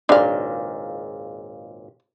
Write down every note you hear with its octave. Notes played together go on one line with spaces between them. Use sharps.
G#1 C#2 A#2 D4 F5